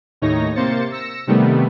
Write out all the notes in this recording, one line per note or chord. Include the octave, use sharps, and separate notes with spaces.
D#2 A2 D#4 C#5 A#6
C3 A#3 C5 A6 C#7
E6 A#6 C#7 E7
C3 D#3 G3 A3 B3